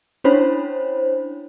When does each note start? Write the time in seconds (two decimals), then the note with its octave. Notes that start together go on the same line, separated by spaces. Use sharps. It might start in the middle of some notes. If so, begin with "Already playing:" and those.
0.24 C#4 D4 E4 C5 C#5 B5